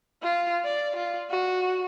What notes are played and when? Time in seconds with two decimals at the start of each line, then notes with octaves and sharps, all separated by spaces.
0.23 F4
0.64 D5
0.96 F4
1.31 F#4